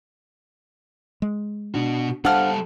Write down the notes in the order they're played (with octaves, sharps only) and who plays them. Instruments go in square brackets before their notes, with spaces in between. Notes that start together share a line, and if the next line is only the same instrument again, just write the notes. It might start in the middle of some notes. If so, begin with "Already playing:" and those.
[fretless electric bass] G#3
[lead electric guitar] B2 F#4 [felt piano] D4
[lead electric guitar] G3 A4 [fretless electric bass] D4 [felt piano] C5 F5 A5 [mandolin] F#5 F6